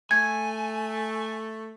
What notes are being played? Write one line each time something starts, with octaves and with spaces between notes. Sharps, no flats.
A3 G#5 G#6